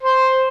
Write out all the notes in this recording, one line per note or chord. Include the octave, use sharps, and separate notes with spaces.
C5